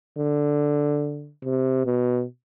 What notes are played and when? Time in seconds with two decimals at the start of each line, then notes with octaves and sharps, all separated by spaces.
0.17 D3
1.44 C3
1.86 B2